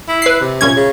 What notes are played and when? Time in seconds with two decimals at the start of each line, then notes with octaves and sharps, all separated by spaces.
0.08 E4
0.22 B4 C7
0.41 C3
0.61 A#2 C#4 G#6
0.76 C#3